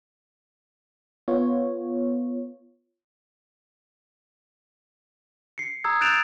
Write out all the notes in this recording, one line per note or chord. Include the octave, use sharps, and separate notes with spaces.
B3 F4 C#5
C7 C#7
A#5 D#6 E6 G#6
F#6 G6 A6 D7 E7 F7